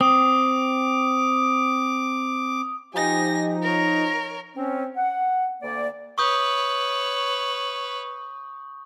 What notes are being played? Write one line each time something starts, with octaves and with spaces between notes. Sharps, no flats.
C4 D6 D#6
F3 D#4 G4 G#5 A#6
A#4 C#5 A#6
C4 C#4
F#5
D2 A#3 D5
B4 C#5 C#6 D#6 G6